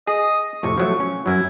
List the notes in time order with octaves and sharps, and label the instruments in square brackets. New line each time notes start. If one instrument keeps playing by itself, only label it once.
[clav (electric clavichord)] G#4 [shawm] D#5
[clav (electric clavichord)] F2 A2 C3 [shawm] C#6
[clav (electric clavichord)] F3 F#3 A3
C#4
[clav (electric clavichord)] F#2 F#3 [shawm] E4